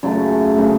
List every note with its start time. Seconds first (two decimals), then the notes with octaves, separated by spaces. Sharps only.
0.03 F#2 C#3 F#3 A3
0.57 C#3 F#3 A3